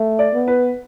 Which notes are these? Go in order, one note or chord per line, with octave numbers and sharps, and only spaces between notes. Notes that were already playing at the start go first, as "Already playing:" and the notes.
Already playing: A3
D5
B3
B4